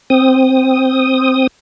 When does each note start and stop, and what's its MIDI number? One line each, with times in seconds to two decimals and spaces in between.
0.10 1.47 60
0.10 1.47 87